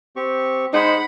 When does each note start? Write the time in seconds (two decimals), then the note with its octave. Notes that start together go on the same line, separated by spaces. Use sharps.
0.16 C4 G4 C#6
0.73 G#3 D#4 G#4 C5 F#5 B5